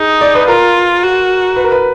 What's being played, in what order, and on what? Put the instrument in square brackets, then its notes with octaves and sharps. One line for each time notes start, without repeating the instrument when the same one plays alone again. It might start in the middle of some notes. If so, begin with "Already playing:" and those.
Already playing: [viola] D#4 [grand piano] G#4
[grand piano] D5
B4
[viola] F4 [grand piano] A#4
[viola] F#4
[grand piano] B4
A#4
B4